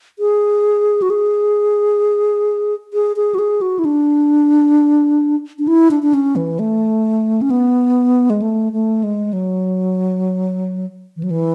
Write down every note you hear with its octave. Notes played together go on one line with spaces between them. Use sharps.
G#4
F#4
G#4
G#4
G#4
F#4
G#4
F#4
E4
D4
D4
E4
D4
D4
C#4
E3
A3
C#4
B3
G#3
A3
A3
G#3
F#3
E3
F#3
E3